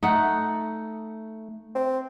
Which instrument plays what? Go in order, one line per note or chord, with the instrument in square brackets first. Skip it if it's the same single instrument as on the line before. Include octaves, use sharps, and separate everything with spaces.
[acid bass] A3 [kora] D#4 F#5
[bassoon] C4